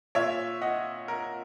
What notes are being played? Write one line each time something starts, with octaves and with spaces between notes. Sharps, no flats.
A#2 C#5 E5
D#5 F#5
A#4